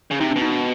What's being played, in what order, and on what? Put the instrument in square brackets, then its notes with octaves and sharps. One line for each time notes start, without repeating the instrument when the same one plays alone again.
[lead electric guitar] C#3
[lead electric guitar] C3 [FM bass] D#4
[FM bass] D4
[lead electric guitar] B2
[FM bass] D#4
D4